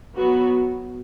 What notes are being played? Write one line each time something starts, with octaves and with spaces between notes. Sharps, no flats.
F#3 B3 F#4